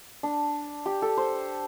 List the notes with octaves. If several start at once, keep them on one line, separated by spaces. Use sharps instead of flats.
D4
G4
A4
C5